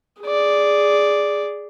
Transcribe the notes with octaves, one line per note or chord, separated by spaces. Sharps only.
G#4 D5